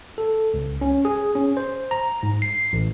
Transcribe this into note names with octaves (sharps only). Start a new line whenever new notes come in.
A4
C#2
C#4
G#4
C#4
C5
A#5
G#2
C7
A1